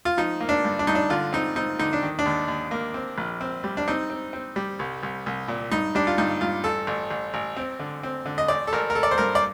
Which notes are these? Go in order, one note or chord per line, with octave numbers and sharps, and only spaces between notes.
F4
F3 D#4
A#3
D4
G2
D4
G2 D#4
D4
D3 F4
C4 D#4
C4 D#4
D3 D#4
D4
D#3
D4
D#2
D#2
A#3
C4
A#1
C4
G3
D4
C4 D#4
C4
C4
G3
C2
C2
C2
A#2
G2 D#4
G3 D4
F4
G2 D#4
G2 F4
A1 A4
A1
A1
A1
C4
D3
C4
D3
D#5
A1 D5
A4
A1 A#4
A#4
A1 A4
D5
C5
G2 A#4
D5